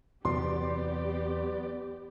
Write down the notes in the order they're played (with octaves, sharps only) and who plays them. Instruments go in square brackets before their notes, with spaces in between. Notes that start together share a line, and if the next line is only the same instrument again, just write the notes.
[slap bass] E2 C3 F#3 [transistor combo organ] B3 D5 [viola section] G4 [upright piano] C6